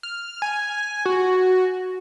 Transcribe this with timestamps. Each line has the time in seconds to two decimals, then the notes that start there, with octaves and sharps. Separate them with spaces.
0.03 F6
0.42 G#5
1.06 F#4